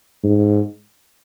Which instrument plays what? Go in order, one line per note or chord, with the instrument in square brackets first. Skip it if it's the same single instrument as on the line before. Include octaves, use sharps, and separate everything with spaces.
[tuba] G#2